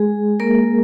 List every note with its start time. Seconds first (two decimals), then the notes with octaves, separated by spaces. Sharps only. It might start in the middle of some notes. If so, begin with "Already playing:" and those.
Already playing: G#3 G#4
0.40 A#3 A#4